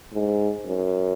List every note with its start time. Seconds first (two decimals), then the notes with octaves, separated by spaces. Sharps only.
0.13 G#2
0.66 F#2